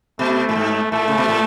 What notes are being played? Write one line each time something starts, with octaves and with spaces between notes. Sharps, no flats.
B2 A3
A2
G#2
A2 A3
C#3
B2
A2